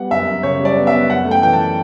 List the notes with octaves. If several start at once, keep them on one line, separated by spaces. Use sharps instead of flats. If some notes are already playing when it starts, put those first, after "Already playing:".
Already playing: G3 B3 F#5
F#2 E5
F#2
C#3 C#5
G3
D5
B3
E5
B3
F#2 F#5
A3
G5
E3 G5
A5